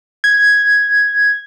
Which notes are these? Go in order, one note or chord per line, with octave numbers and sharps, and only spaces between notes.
G#6